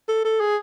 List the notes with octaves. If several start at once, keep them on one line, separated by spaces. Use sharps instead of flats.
A4
A4
G#4